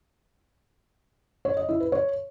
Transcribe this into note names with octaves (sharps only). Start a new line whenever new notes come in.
C#5
D#5
E4
B4
C#5